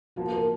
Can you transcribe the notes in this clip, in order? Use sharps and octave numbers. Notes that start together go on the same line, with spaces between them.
F3 A#3 F4 F#4
A#4